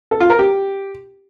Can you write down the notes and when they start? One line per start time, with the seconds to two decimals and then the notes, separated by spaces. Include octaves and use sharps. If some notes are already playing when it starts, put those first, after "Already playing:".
0.11 A4
0.20 F4
0.30 A#4
0.39 G4